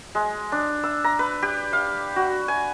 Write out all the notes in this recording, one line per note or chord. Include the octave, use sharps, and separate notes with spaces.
G#3
D4
E6
A#5
B4
G4
F5
F#4
G#5